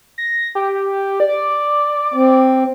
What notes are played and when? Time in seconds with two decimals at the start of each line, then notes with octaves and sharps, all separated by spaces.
0.18 A#6
0.55 G4
1.20 D5
2.14 C4